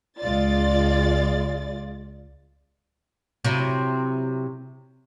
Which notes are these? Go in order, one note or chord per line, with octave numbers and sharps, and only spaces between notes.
C#2 G#3 F4 D5 A6
C3 F#3 E4